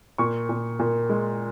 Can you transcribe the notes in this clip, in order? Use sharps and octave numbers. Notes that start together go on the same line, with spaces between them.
A#2 C#6
A#2
A#2
G#3